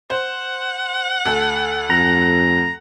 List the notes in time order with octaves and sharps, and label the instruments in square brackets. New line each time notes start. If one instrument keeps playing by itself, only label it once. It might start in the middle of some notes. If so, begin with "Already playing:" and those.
[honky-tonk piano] C5 [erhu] F#5
[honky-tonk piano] D2 A4
[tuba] F2 [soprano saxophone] A#5